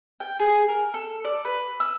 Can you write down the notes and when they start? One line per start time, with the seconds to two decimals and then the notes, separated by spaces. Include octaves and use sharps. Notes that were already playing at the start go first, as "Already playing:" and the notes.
0.20 G5
0.40 G#4
0.68 A#4
0.94 A4
1.25 D5
1.45 B4
1.80 E6